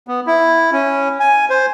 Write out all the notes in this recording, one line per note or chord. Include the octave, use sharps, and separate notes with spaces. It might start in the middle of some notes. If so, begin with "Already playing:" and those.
B3
E4
C#4
G#5
C5